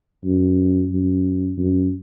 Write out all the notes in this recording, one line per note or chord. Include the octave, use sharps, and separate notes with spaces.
F#2
F#2
F#2